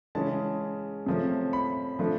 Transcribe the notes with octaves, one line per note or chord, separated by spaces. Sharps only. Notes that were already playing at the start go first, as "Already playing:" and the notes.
C#3 E3 G#3 C#4 A5
C3 F3 A3 C#4
B5
F3 A3 D4